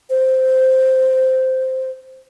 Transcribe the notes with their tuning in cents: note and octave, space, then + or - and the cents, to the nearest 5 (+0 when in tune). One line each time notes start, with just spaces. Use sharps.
C5 -5